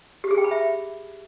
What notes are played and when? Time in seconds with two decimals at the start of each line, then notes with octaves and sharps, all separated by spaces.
0.24 G4
0.31 G#4
0.37 G5
0.44 B5
0.51 E5